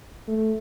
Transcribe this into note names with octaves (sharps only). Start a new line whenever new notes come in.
A3